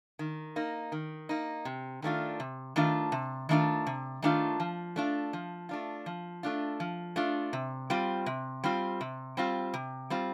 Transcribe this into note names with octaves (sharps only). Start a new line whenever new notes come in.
D#3
A#3 D#4
D#3
A#3 D#4
C3
D#3 A3 D4 F4
C3
D#3 A3 D4 F4
C3
D#3 A3 D4 F4
C3
D#3 A3 D4 F4
F3
A3 D4 F4
F3
A3 D4 F4
F3
A3 D4 F4
F3
A3 D4 F4
C3
G3 C4 F4
C3
G3 C4 F4
C3
G3 C4 F4
C3
G3 C4 F4